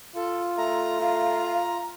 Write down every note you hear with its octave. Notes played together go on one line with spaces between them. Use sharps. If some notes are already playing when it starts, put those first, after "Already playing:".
F4 A4
A3 A#5
F4 F5